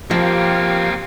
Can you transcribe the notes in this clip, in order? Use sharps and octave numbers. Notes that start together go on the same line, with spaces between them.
F3 A#3 C4 G4 F5